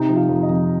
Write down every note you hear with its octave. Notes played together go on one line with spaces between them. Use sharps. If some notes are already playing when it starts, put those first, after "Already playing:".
Already playing: C3 D#4
F3
F4
F2
D#5
F2